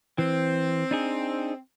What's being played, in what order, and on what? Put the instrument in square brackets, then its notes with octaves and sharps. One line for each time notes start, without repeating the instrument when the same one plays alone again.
[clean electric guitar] E3 [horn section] C4
[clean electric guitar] D4 D#4 G#4